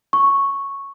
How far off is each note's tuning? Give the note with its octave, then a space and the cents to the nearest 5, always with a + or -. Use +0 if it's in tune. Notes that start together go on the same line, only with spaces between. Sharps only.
C#6 -5